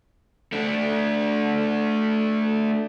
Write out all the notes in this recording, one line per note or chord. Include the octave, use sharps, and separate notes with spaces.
A3 D4